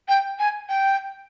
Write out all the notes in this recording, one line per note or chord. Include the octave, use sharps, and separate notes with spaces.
G5
G#5
G5